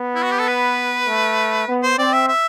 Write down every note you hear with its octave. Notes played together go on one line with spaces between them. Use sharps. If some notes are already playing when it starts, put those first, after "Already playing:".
Already playing: B3
E4
F#4
G4
A4
B4
A3
B3
C5
C4 D5
E5
E5